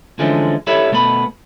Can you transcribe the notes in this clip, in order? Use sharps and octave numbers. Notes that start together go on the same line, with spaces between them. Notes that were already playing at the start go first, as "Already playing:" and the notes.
D3 E3 F3 G#3 A3 C#4
E4 G4 A4 B4 C#5 E5
B2 A3 B3 B5